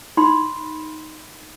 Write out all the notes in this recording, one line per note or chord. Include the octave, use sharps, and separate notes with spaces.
D#4 B5 C6